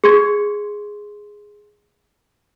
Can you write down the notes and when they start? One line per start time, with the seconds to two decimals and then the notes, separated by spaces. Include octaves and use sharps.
0.04 G#4 C6 G#6